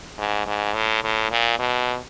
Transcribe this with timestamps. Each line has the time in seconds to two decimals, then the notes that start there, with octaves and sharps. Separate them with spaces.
0.18 G#2
0.47 G#2
0.75 A2
1.03 A2
1.31 A#2
1.59 B2